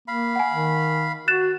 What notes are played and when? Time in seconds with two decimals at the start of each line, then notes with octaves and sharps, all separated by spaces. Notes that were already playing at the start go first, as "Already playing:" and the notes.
0.08 A#3 F5 B5
0.36 F#5 G#5
0.51 D#3
1.28 F#4 F#6 A6 E7